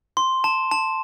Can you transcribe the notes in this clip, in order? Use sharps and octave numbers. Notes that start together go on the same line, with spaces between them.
C6
A5
A5